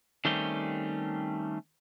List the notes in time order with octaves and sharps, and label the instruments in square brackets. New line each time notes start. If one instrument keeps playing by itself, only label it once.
[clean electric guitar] D#3 G3 A3 C4 C#4 G4